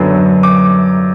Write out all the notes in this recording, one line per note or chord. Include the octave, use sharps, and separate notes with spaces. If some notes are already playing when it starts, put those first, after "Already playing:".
Already playing: F#2 D3 F#3 B3
D6